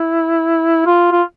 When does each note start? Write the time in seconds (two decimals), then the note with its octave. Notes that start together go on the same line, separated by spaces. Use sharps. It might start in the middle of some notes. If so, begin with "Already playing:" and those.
Already playing: E4
0.86 F4
1.12 F4